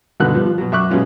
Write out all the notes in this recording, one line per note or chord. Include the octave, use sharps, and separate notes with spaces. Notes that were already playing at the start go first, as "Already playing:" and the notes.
G2 B2 D3 D#3 B3 F#6
F3 G3 B3
F3
B2 F#3
F#2 E5 C#6 D6 F#6
B2 F#3 G#3 C#4 F4